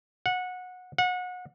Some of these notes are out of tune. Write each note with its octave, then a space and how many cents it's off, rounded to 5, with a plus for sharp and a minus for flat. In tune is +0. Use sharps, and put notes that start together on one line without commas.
F#5 -20
F#5 -30